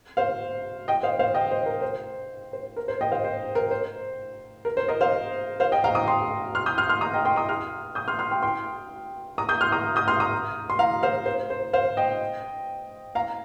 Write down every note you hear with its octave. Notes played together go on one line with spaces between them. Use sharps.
C5 F5
D#5 G5
C5 F5
C5 F5
D#5 G5
C5
A#4
C5
C5
A#4
C5
D#5 G5
C5 F5
C5
A#4
C5
A#4
C5
A#4 D#5
C5 F5
C5 F5
D#5 G5
F5 A#5
A#5 D#6
G5 C6
C6 F6
D#6 G6
C6 F6
C6 F6
A#5 D#6
D#5 G5
G5 C6
A#5 D#6
C6 F6
D#6 G6
C6 F6
C6 F6
G5 C6
G5 C6
A#5 D#6
D#6 G6
C6 F6
A#5 D#6
D#6 G6
C6 F6
A#5 D#6
C6
F5 A#5
C5 F5
C5
C5
C5 F5
D#5 G5
F5 A#5